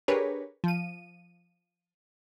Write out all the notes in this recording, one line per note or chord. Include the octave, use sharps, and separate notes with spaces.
D4 G4 G#4 A#4 B4 C#5
F3 D#7